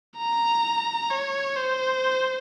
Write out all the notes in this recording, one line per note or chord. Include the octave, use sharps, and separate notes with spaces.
A#5
C#5
C5